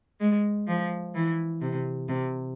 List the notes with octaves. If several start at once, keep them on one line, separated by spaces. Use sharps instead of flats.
G#3
F3
E3
C3
C3